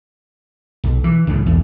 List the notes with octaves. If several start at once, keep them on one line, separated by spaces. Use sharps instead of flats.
B1
E3
C#2 A2 C#3
B1 E2